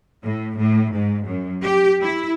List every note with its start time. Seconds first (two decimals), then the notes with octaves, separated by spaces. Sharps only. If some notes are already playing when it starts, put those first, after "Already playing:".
0.24 A2
0.57 A2
0.93 G#2
1.26 F#2
1.64 G4
2.02 E4